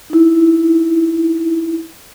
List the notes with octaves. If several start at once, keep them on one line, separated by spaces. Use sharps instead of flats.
D#4 E4